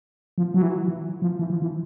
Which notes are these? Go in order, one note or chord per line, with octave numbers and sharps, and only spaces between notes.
F3
F#3
E3
E3
F3
E3
F3
E3